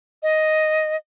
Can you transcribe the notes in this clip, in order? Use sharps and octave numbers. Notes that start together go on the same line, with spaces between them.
D#5